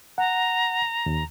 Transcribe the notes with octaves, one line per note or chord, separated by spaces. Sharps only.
F#5 A#5
D#2